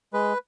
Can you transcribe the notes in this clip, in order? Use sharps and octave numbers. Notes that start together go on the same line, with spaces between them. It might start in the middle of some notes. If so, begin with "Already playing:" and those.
G#3 B4